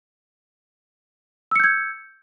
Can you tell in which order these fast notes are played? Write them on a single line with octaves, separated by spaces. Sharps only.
E6 C#7 G6 G#6